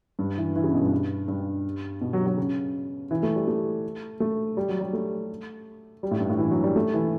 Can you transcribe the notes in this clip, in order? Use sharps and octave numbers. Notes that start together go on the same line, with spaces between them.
G2
E3
E3
C#3
B2
G2
G2
B2
F#3
F#3
C#3
E3
A3
G3
A3
A3
G3
F#3
G3
A3
G3
A2
G2
A2
E3
F#3
G3
A3
E3